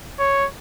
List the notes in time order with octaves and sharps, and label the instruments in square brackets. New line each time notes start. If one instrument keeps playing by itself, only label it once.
[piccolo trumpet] C#5